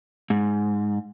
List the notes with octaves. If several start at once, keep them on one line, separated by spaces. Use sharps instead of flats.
G#2